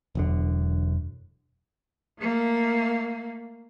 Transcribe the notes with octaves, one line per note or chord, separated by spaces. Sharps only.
E1 F#2 D3
A3 A#3